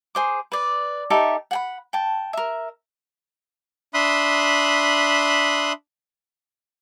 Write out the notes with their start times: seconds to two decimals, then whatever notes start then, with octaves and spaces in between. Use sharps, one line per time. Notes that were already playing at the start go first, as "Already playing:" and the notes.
0.15 G#4 C5 D6
0.52 B4 D5
1.10 D#4 G4 A4 E5
1.51 F#5 G5 B5
1.93 G5 A5
2.33 A#4 E5
3.94 D4 E5 B5 C6 D#6 F#6